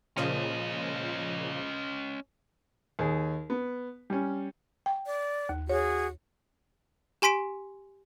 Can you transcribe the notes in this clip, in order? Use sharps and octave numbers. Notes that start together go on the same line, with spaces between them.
A#2 C#3 F3 C#4 D#5
D#2 G#4
B3
G3 C#4
G5
D5
D#2
F#4 G#4 C#5
G4 G#5 C6 B6 D7